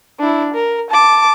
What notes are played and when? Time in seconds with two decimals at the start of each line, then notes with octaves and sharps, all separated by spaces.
0.19 D4 E4
0.54 A#4
0.90 A5 D6